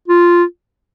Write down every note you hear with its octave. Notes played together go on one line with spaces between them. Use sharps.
F4